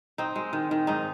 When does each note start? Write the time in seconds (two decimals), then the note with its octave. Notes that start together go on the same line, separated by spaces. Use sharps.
0.18 C4 D#4
0.36 G#3
0.53 D#3
0.71 D#3
0.87 G#2 D#4